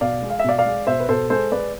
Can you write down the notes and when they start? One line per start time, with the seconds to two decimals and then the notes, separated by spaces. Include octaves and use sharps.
0.01 B2 D5 F5
0.22 G#3
0.30 F5
0.39 E5
0.44 B2 D5 F5
0.59 D5 F5
0.66 G#3
0.87 B2 C5 E5
1.00 B4
1.09 B2 A4 C5
1.30 G#3 A4 C5
1.52 G#3 B4 D5